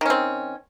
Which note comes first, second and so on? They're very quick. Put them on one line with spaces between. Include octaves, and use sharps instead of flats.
D#3 C#4 C4